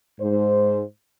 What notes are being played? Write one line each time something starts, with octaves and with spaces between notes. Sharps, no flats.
G#2 C5